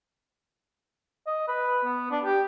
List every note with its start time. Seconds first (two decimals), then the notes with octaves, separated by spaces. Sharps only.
1.26 D#5
1.48 B4
1.85 B3
2.11 D4
2.24 G4